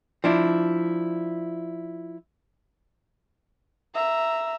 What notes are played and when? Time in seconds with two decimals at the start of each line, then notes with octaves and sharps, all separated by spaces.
0.24 F3 D4 E4
3.95 E5 A#5